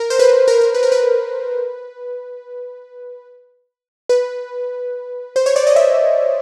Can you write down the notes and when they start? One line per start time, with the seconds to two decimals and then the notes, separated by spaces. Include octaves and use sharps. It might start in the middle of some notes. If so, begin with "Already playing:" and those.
Already playing: A#4
0.10 C5
0.19 B4
0.48 A#4
0.61 A#4
0.74 B4
0.83 A#4
0.92 B4
4.09 B4
5.36 C5
5.46 C#5
5.56 D5
5.67 D#5
5.76 E5